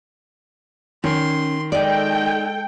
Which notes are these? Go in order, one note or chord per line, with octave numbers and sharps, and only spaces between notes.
D#3 C#4 C6
G#3 D#4 A4 D5 G5